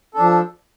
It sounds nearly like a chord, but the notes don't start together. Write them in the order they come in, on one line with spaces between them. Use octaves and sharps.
A4 D4 F3